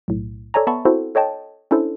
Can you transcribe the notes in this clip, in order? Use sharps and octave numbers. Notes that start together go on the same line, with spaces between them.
B1 A2
A4 C#5 D5 G#5 A#5
B3 E5 A5 B5 C#6
C4 E4 F#4 A4 C5
A4 C#5 D#5 G5 A5
C#4 D4 E4 A4 C5